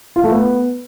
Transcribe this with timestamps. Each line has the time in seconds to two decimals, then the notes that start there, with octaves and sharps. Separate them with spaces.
0.16 F4
0.24 A3
0.32 B3